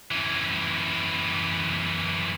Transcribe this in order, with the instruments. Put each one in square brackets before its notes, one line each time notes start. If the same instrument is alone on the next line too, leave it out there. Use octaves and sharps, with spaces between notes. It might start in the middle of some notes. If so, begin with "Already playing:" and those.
[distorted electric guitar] F#2 E3